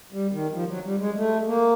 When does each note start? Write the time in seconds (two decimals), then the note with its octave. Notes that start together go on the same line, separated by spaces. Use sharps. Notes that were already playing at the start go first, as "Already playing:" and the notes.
0.13 G3
0.32 D#3
0.53 F3
0.68 F#3
0.85 G3
0.99 G#3
1.16 A3
1.47 A#3